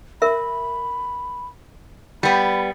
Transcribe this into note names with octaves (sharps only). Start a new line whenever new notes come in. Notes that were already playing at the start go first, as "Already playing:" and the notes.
A#4 E5 B5
G3 B3 G5 B5